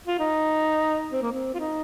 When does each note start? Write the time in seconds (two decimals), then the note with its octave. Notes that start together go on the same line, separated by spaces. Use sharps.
0.07 F4
0.19 D#4
1.13 C4
1.22 A#3
1.32 C4
1.55 F4
1.60 D#4